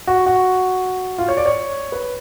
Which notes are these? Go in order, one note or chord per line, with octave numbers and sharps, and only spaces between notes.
F#4
F#4
F4
C#5
D5
C#5
B4